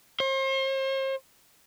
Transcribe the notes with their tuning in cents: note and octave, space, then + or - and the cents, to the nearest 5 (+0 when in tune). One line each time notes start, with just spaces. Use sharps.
C5 +40